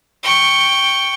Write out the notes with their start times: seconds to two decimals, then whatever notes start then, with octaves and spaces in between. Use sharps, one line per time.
0.23 G5 C#6